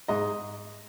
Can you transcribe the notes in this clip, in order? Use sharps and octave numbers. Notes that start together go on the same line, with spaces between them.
G#2 D#5